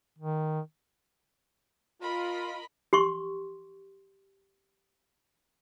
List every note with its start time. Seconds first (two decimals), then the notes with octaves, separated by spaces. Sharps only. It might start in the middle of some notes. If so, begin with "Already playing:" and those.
0.18 D#3
2.01 F4 A#4 D#5 B5
2.93 G4 C6 C#6